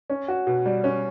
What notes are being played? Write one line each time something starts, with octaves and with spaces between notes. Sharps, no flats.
C#4
F#4
B2
G3
C#4